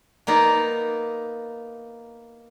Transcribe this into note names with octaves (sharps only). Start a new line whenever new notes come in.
A#3 B3 D#4 D5